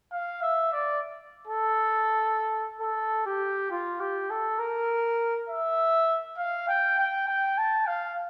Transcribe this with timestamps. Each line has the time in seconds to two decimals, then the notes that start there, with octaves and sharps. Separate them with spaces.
0.12 F5
0.42 E5
0.73 D5
1.47 A4
2.81 A4
3.26 G4
3.71 F4
4.00 G4
4.30 A4
4.59 A#4
5.49 E5
6.38 F5
6.68 G5
6.98 G5
7.28 G5
7.58 A5
7.87 F5